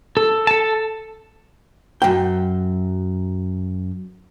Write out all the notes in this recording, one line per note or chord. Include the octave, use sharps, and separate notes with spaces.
A4
A4 A5
F#2 G5